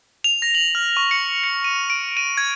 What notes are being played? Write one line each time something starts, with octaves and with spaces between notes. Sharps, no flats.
F7
A#6
F#7
F6
C#6
C#7
C#7
D#7
D7
D#7
G#6